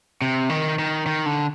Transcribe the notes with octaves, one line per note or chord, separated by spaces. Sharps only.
C3
D#3
D#3
D#3
D3